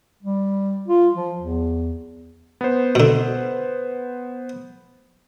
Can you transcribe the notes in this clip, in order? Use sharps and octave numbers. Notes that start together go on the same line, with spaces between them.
G3
F4
F3
E2
B3 C5
B2 D3